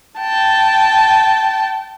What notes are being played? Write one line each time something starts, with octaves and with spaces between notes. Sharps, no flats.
G5 A5